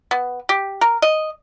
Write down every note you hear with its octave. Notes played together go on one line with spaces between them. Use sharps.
B3
G4
A#4
D#5